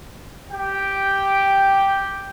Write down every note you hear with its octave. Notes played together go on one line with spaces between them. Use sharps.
G4 G5